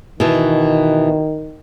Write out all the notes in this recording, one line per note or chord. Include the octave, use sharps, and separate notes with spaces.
B2 D#3 E3